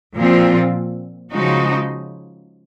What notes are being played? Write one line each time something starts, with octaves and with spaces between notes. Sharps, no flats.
A#2 F3 C4 F4
C#3 F3 G#3 D#4 F#4